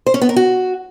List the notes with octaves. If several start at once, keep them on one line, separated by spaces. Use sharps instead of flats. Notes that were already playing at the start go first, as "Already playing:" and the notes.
C5
C#4
B3
A#4
F#4